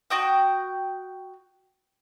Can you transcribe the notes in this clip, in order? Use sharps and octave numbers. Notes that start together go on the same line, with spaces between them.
F#4 G5 D#6